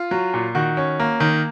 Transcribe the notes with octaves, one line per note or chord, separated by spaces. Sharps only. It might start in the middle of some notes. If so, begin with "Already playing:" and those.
Already playing: F4
F#3
A#2
D#3 F#4
C#4
A#3
D#3